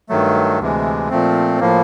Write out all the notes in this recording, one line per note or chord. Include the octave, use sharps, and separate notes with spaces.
G2 D#3 F#3 A3
D2 C3 E3 G#3
A#2 F3 A3 C4
A2 F3 A#3